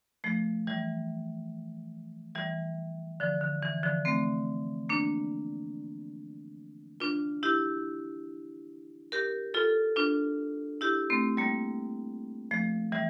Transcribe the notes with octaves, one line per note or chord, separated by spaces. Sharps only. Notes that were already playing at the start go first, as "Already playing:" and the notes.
F3 A3
E3 G3
E3 G3
D3 F3
D3
E3
D3 F3
A3 C4
A#3 D4
D4 F4
E4 G4
G4 A#4
F4 A4
D4 F4
E4 G4
A3 C4
G3 A#3
F3 A3
E3 G3